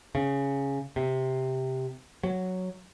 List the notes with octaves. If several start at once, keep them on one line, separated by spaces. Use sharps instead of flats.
C#3
C3
F#3